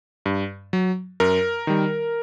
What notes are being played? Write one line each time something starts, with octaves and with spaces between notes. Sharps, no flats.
G2
F#3
F#2 A#4
D#3 G3